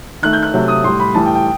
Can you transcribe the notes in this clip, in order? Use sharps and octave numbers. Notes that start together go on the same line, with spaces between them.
D#3 A3 F#6
G6
F#6
C3 F#3 A3
D#6
A2 G3 C6
B5
A2 E3 G3 A5
G5
G5